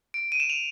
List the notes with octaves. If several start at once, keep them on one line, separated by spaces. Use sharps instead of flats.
D7
D#7
E7
F7